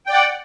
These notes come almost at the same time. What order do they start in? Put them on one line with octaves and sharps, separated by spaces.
G5 D5 F#5